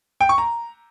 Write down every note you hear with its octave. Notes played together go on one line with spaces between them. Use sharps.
G5
C#6
A#5